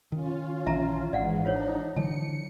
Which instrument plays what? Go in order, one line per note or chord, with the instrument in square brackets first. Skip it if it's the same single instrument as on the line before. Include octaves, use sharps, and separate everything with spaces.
[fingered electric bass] D#3 [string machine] C#4 F4
[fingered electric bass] A#1 D#3 E3 [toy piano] E5 A5 A#5
[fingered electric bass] G#1 [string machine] G#2 E3 [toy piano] D5 F5 F#5
[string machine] D4 D#4 [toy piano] F4 C5 C#5
[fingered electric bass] D3 E3 F#3 [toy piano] A5 [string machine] C#7